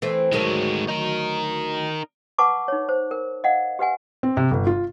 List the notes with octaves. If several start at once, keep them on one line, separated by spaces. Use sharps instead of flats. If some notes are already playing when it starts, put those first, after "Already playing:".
E3 A3 C4
D2 D#3 F#3 G#3 A#3
D#4 A#4
B4 F#5 A5 C#6 D6
D#4 C#5
C5
A#4
D#5 F5 F#5
G4 B4 F#5 G#5
C4
C3
G1
F4